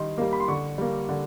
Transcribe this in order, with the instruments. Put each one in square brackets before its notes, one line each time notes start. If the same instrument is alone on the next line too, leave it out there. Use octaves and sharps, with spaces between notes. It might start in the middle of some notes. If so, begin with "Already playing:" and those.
Already playing: [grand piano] D#3 G3 C6
G3 A#3
B5
C6
D3 C#6
G3 A#3
D3